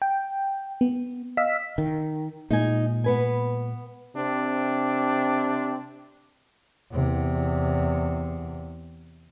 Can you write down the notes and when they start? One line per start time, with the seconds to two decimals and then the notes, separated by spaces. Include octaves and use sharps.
0.02 G5
0.81 B3
1.37 D#5 F5 E6 B6
1.78 D#3
2.50 A#2 G#3 D#4 G#5
3.04 B3 B4 G#5
4.15 C3 C4 D4
6.92 E2 C3